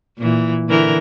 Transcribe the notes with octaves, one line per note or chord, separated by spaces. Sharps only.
A#2 E3
D3 E3 A#4